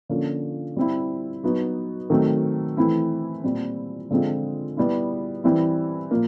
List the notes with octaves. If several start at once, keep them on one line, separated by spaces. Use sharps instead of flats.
D3 F3 A#3 C#4
G3 C4 E4
F#3 B3 D#4 F#4
D#3 F#3 A3 C4
E3 A3 C4 E4
A#2 G3 C4
D3 F3 G#3 C4 F4
G3 B3 E4
E3 G3 C4 E4
A#2 F3 A#3